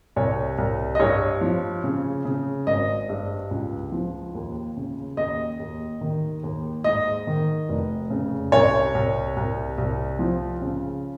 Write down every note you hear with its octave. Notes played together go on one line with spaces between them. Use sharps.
C2 C#5
C2
D#5
G2 C#5
F3
C#3
C#3
G#1 D#5
G2
C#2
F3
D#2
C#3
D#2 D#5
D#2
D#3
D#2
G#2 D#5
D#3
F1
C#3
C2 C#5
C2
C2
C2
F3
C#3